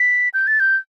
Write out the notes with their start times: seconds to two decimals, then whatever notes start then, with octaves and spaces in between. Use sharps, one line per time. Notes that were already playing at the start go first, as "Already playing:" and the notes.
Already playing: B6
0.34 G6
0.47 A6
0.60 G6